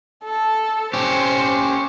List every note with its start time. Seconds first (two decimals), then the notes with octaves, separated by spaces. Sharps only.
0.24 A4
0.94 C#4 G4 C5